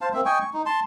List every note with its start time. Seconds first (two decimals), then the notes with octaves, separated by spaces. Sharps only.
0.01 C5 F5 A5
0.14 A#3 C4 E5
0.25 D#5 G5 G#5 C#6
0.41 C#6
0.53 D#4
0.66 A5 C6